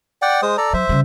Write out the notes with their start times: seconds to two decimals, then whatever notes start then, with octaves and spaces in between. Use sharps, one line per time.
0.22 D5 F#5 G5
0.42 G#3 C5 D#6
0.57 A4 D5 A#5
0.73 F#3 C5 E5
0.89 C#3 G3